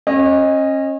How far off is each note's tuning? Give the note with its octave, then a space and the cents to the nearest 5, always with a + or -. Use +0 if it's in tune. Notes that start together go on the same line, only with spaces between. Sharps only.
C#4 -35 D#5 +0